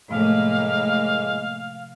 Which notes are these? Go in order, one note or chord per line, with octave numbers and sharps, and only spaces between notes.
A2 C3 F3 G#3 A#3 F5